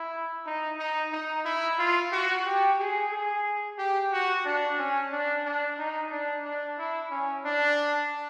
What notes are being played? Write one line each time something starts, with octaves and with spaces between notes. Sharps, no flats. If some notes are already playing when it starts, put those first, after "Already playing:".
Already playing: E4
D#4
D#4
D#4
E4
F4
F#4
G4
G#4
G#4
G4
F#4
D4
C#4
D4
D4
D#4
D4
D4
E4
C#4
D4